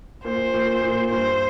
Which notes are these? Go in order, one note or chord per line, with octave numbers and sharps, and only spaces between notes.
A#2 C5
A#2
A#2
G2 C5